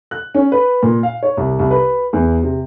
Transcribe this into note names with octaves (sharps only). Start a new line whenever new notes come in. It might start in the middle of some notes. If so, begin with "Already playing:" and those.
F#6
C#4
B4
A#2
F5
C#5
C2
C2
B4
E2
C3